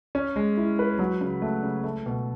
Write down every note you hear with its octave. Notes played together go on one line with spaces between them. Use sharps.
C#4
G#3
E4
B4
F#3
C#3
A3
C#3
A3
B2